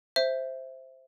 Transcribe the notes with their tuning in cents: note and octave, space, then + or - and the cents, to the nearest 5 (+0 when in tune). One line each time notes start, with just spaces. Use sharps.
C5 +0 E5 +0